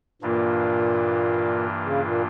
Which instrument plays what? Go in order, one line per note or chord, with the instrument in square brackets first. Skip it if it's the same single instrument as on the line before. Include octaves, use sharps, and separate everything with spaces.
[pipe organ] G2 E3 A#3 D4 F4 [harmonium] A#2
[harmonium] C#3
A#2